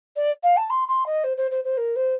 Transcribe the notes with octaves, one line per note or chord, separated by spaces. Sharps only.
D5
F5
A5
C6
C6
D#5
C5
C5
C5
C5
A#4
C5